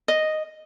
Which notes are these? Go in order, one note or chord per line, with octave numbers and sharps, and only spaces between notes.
D#5